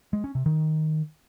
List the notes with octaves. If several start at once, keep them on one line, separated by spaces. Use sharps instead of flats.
G#3
C#4
C3
D#3